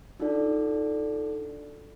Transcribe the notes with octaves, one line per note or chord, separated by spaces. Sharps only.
D4 D#4 F4 F#4 A4 D5